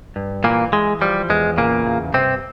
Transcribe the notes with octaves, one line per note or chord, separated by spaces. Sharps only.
G2
A#2 E3 A#3
E3 G#3
F3 G3
E2 G#3
A#2 C#3 A#3
E2
G2 C3 C4